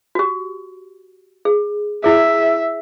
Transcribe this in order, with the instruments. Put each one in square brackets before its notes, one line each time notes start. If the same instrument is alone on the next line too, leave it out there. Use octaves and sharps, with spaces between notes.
[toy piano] F#4 G4
G#4
[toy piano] E4 G#4 [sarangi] E5